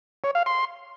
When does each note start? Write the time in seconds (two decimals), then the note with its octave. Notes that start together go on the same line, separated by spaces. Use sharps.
0.24 C#5
0.35 F5
0.46 C6